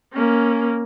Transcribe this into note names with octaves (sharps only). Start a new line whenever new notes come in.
A#3 C#4